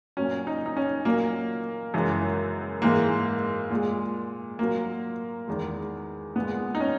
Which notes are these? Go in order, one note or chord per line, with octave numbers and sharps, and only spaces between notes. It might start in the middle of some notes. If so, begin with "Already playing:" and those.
A#2 F#3 C#4
D#4
D#4
C#4
A#2 F#3 A#3
F#2 C#3 E3 G#3
G#2 E3 G#3 A#3
A#2 G#3
A#2 F#3 A#3
E2 D#3 G#3
A#2 G#3 B3
D#4
C#4